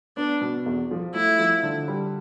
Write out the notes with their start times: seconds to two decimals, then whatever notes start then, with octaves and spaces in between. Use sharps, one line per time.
0.17 B3 D4
0.41 B2
0.66 E2
0.91 F3
1.15 A3 E4
1.39 F3
1.63 D3
1.88 G3